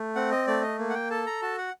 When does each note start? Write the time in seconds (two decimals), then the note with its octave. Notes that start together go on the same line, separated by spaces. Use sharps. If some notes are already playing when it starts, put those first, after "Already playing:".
Already playing: A3
0.15 C4 F#5
0.31 D#5
0.47 A3 D5
0.62 D#5
0.79 A#3
0.90 F#5
0.94 G5
1.10 A4 A5
1.26 A#5
1.42 F#4 A5
1.58 F#5